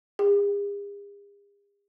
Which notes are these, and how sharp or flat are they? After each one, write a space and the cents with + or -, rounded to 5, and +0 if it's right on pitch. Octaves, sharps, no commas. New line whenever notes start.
G#4 -45